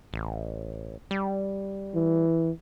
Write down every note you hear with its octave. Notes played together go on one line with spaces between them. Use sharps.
A1
G3
E3